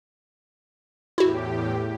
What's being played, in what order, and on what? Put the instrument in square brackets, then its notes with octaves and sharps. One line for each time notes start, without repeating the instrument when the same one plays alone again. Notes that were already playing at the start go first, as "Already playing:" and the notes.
[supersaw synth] E2 A2 G4 [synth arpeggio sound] E4 F#4